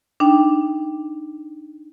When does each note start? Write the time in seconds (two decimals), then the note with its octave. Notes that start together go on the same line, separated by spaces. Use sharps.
0.20 D4 D#4 G5